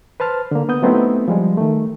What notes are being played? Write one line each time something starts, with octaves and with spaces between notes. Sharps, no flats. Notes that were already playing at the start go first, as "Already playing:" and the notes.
B4 C5 A5 F6
D3 A#3
B3 D#6 G6
F#3 A3 B3 C4 D#4 E4
F3 G3 G#3
D#3 A3